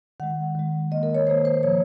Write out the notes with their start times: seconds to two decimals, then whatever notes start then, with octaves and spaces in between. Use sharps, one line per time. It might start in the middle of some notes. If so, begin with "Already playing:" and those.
0.20 D#3 G#3 F#5
0.55 D#3 G#3
0.91 D#3 A#3 D#5
1.03 A#4
1.15 C#5
1.27 D#3 A#3 C5
1.45 C5
1.63 A#2 F3 A#3 C#5